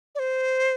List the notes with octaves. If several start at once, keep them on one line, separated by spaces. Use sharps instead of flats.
D5
C5